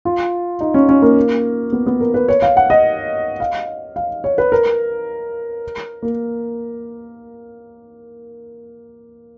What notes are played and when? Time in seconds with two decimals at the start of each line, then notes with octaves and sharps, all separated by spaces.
0.05 F4
0.61 D#4
0.74 C#4
0.89 C#4
1.02 A#3
1.72 B3
1.86 B3
2.01 A#4
2.14 B4
2.28 C#5
2.42 F5
2.57 F#5
2.70 D#5
3.40 F5
3.96 F5
4.24 C#5
4.38 B4
4.52 A#4
6.02 A#3